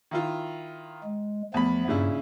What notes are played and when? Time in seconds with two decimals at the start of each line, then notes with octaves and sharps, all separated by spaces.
0.11 D#3 E4 F4
1.04 G#3
1.54 E2 F3 A3 B3 B5
1.88 G2 A#2 C#3 E4